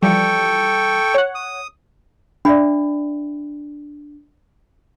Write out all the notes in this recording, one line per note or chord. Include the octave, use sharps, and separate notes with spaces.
E3 F3 G3 A4 G5 C#6
C#5 F#5
D#6
D4 D5 E5 B5